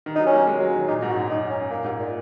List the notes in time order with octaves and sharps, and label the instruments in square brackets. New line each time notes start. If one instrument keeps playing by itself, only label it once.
[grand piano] D#3
[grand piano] F#3 [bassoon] D#4
[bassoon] C#4
[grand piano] A#3
G#3
F#3
D#3
[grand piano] A#2 [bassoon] D#4
[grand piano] G#2
[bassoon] F#4
[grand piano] F#2
[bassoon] D#4
C#4
[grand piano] A#2 [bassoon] A#3
[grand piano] G#2
[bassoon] A#2